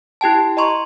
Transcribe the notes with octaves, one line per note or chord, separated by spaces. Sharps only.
E4 G4 G5 A5
D#5 A#5 C6 C#6